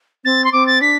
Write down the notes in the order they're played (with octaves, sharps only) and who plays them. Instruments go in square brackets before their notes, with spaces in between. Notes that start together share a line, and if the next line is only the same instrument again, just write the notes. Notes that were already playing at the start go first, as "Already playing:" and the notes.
[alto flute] C4 [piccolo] A6
[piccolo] C6
[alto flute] C4 [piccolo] D6
[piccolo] A6
[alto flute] D4 [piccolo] B6